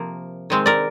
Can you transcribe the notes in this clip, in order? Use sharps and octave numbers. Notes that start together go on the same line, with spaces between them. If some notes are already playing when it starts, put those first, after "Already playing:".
Already playing: C3 F3 A#3
D#3 G#3 C4
A#4 D5